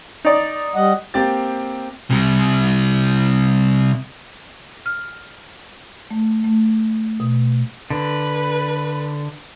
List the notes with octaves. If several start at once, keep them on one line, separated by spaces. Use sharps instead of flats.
D#4 D5
G3 D#5 F#5
A#3 C4 G4 A6
C3 G3
F6
A3
A3
B2
D3 B4